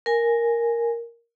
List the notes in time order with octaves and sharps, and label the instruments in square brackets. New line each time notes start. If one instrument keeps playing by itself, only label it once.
[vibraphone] A#4 G#5